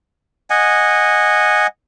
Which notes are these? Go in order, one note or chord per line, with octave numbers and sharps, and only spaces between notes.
D#5 F#5 G#5